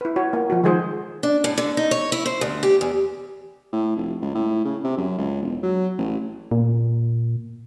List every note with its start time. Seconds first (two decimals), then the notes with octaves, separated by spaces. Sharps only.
0.01 E4 B4
0.16 F#4 C#5
0.33 A#3
0.50 F3 F4 F#4
0.64 D#3 F3 G#3 G#4 C5
1.23 D4
1.44 A2
1.58 D3
1.77 D#4
1.91 C#5
2.12 E4
2.26 C5
2.41 D2
2.63 G4
2.81 E2
3.73 A2
3.97 F1
4.21 C#2
4.35 A2
4.65 C#3
4.84 C3
4.98 F#2
5.18 C#2
5.42 E1
5.63 F#3
5.98 A1
6.51 A#2